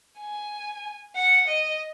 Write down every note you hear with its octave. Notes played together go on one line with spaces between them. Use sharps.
G#5
F#5
D#5